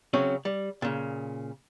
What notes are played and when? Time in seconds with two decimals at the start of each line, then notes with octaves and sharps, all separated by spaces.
0.13 C#3 F#3 C4 C#4
0.45 G3
0.82 A#2 C#3